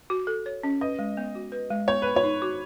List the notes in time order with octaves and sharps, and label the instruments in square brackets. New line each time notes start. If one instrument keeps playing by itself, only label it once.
[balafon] F#4
A4
C#5
C#4
[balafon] B4 [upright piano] D#5
[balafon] G#3
B3
F#4
B4
G#3
[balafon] B3 [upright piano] C#5
[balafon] B3 [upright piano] B4
[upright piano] C#5
[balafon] D#4
F#4